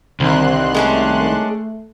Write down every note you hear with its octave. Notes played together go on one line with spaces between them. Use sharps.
C2 D3 D#3 G3 C4 C6 F#6
G#3 A3 C#4 D4